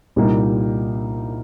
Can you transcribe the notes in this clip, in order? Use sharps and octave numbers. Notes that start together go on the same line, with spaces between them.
C2 A#2 G3 A#3 D#4